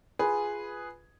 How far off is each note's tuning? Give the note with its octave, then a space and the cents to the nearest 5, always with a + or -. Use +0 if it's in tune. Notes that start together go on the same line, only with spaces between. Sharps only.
F4 +0 G#4 +0 B4 +0